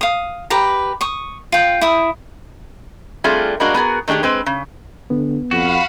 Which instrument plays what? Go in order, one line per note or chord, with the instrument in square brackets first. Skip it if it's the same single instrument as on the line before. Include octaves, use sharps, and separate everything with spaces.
[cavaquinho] F5 D#6
G4 B4 A#5
C#6 D#6
F4 G5
E4 D#6
[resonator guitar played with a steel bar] G3 A3 C4 D4 F4 G#4
G3 G#3 A#3 D4 F#4
B3 F#4 G#4 A#4
D#3 A3 D4 G4 G#4
G#3 C4 B4
C#3
[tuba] D3 [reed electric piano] B3
[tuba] F2 [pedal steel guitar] F#4 [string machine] F5 F#5 B5